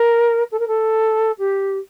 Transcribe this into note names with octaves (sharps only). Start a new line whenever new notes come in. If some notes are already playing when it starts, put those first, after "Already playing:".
Already playing: A#4
A4
A#4
A4
G4